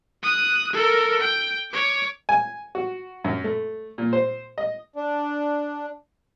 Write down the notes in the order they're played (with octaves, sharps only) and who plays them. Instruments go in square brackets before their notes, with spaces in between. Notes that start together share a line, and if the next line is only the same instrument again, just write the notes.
[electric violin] D#6 F#6
A4 A#4
G5
C#5 D6
[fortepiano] G#5
F#4
F#2
A3
A#2
C5
D#5
[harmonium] D4